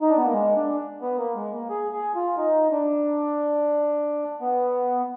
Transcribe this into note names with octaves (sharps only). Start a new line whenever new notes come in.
D#4
D4
B3
A#3
G#3
D4
B3
A#3
G#3
A#3
G#4
G#4
F4
D#4
D4
B3